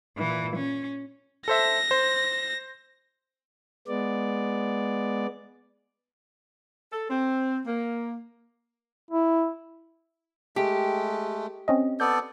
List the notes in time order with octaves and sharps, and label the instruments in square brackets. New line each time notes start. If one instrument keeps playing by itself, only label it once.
[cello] A#2 E3
C#4
[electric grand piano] A4 C5 E5 [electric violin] A#6
[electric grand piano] C5
[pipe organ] G#3 B3 D5
[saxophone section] A4
C4
A#3
[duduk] E4
[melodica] G#3 A3 [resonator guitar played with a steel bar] G4
[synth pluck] C4 C#4 D#5
[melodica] B3 A4 D5 [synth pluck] G6